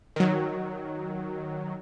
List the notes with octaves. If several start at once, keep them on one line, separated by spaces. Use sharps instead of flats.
D#3 F#3